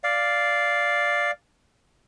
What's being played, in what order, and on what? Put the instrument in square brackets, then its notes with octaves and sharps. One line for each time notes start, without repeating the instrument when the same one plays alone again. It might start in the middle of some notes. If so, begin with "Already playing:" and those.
[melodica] D5 F5